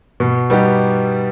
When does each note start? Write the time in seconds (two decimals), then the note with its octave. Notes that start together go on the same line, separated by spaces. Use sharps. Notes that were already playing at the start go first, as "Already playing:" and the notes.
0.20 B2
0.50 G3 B3 D#4 G4